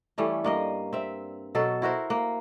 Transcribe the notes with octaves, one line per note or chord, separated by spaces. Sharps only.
E3 G3 A3 C#4
G2 A#3 D#5
C4 E5
B2 F#3 A4
E4 F#4 A#4 C5
A#3